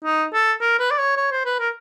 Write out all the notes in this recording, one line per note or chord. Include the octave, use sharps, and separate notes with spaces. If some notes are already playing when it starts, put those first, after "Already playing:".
D#4
A4
A#4
B4
D5
C#5
C#5
C5
B4
A#4